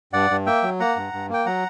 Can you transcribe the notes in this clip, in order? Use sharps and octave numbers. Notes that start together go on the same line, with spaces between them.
G2 D5 F#5
G2
A#3 E5 G5
F#3
A#3 F#5 A#5
G2
G2
A#3 G5
F#3 F#5 A#5